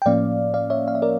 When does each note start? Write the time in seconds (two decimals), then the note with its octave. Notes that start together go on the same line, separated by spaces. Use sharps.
0.02 G5
0.06 A2 F3 A#3 C#4 D5 F5
0.54 D5 F5
0.70 C#5 E5
0.88 F5
0.95 E5
1.02 A#4 D5